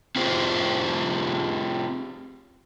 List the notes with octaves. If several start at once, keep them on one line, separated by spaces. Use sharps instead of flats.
C4 F4 G4 G#4 C5